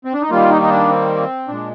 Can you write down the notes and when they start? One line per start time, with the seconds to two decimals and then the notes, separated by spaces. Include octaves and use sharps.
0.05 C4
0.14 D4
0.22 D#4
0.30 D#3 G3 A#3 F4
0.50 D#4
0.62 D#4
0.70 D4
0.90 C4
1.48 A#2 G#3 D4